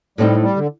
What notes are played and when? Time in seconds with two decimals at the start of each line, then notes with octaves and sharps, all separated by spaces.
0.18 A2 G3 A3 C4 D#4
0.42 G3
0.56 D3